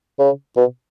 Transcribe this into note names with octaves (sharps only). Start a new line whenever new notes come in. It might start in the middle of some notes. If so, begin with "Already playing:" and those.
C#3
B2